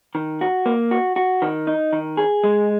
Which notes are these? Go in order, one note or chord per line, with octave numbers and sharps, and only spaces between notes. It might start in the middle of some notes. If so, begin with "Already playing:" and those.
D#3
F#4
A#3
F#4
F#4
D#3
D#4
D#3
G#4
G#3